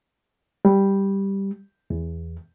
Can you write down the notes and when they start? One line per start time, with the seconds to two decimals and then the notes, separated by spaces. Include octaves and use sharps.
0.65 G3
1.90 E2